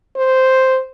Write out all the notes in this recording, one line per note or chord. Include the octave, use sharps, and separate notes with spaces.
C5